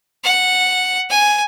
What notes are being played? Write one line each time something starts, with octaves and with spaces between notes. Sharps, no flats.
F#5
G#5